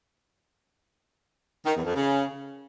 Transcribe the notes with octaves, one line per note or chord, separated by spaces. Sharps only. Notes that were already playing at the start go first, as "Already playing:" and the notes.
D#3
E2
F2
C#3